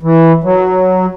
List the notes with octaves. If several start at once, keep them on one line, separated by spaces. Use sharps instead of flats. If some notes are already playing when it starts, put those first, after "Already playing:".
E3
F#3